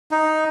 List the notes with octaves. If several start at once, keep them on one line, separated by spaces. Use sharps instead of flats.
D#4